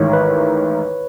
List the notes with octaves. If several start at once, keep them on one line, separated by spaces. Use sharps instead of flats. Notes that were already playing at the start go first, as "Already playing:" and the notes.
Already playing: A1 G#2 D#3 C#5
B4